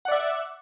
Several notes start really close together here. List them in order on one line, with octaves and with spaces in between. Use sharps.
F#5 D5 E5